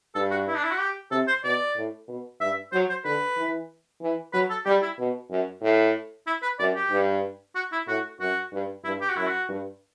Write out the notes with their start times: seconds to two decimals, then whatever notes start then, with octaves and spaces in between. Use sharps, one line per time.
0.15 G2 A4
0.31 F#4
0.47 E4
0.56 D4
0.64 E4
0.71 F#4
0.80 G4
1.11 C3 A4
1.27 C5
1.44 B2 D5
1.76 A2
2.08 B2
2.40 G2 E5
2.72 F#3 C5
2.89 C5
3.05 D3 B4
3.37 E3
4.01 E3
4.33 F#3 B4
4.50 A4
4.65 G3 G4
4.82 E4
4.98 B2
5.30 F#2
5.62 A2
6.27 E4
6.42 B4
6.59 F#2 D5
6.75 G4
6.91 G2
7.55 F#4
7.72 E4
7.87 A2 F#4
8.20 F#2 F#4
8.53 G2
8.84 G2 E4
9.01 G4
9.09 F#4
9.16 F#2 E4
9.27 F#4
9.49 G2